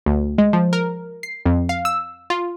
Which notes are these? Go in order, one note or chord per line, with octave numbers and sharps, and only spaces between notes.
D2
G#3
F3
A#4
C7
F2
F5
E6
F4